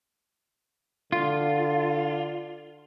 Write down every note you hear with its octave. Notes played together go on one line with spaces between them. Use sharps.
D3 F4